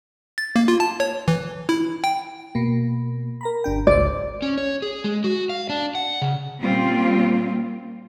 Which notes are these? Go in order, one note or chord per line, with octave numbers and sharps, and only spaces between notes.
A6
A#3
F4
A5
C#5
E3
E4
G5
B2 A#3
A#4 A#5 B5
G1 D4 G5
G#1 C#2 C5 D5
C#4
C#5
G#4
G#3
F#4
F5
D4
F#5
C#3
A#2 G3 A#3 C4 C#4 F4